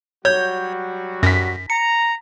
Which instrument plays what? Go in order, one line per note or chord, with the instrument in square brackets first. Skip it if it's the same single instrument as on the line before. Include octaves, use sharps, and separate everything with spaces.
[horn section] F#3 G3 F#4 [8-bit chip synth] C#5 [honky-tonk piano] G6
[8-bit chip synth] F#2 [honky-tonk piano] A#6 B6
[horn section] A#5 [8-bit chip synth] C#7